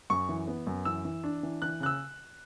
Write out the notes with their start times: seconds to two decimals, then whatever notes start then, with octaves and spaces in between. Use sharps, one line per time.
0.10 F#2 C#6
0.29 E3
0.48 B3
0.67 F#2
0.85 E3 E6
1.05 E3
1.24 D4
1.43 E3
1.62 E3 F#6
1.80 C#3 F#6
1.86 E6